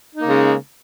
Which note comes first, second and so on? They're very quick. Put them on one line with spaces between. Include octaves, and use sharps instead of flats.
D#4 A#3 C#3 G#3